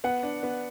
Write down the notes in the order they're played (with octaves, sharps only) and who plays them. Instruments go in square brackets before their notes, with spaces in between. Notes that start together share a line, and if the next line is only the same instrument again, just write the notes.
[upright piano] B3 [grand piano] F#5
[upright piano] D4
B3